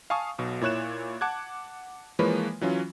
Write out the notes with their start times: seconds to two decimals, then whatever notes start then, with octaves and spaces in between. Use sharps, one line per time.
0.10 F5 G#5 A5 C#6 D#6
0.38 B1 B2
0.61 A#2 E4 C#5 F#6 E7
1.21 F#5 A5 D6 F#6 G#6
2.19 E3 F3 G#3 A#3 B4 C#5
2.61 E3 F#3 C#4 F4